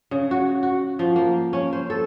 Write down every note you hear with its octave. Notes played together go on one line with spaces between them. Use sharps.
C#3
F#4
F#4
F3
A#3
C#4
C5
A4